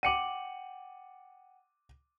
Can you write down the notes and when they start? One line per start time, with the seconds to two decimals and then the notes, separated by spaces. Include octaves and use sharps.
0.03 F#5 G5 D6 C#7 D#7 F#7